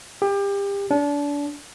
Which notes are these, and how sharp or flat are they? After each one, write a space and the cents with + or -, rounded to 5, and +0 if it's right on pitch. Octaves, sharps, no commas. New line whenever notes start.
G4 +30
D4 -30